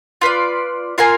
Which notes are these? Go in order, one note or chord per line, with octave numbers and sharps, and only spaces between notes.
F4 B4 D5
F4 A#4 F5 G#5